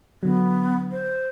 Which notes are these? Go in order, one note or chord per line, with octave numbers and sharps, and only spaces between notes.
D3 F#3 B3
C5